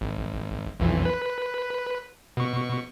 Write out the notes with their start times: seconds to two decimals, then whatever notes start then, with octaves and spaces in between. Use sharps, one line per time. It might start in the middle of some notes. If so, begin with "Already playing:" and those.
0.01 G#1
0.80 B1 F2 E3
1.05 B4
2.37 B2 C#6